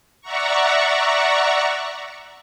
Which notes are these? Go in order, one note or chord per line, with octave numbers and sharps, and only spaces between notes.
D5 E5 F#5 A#5 C#6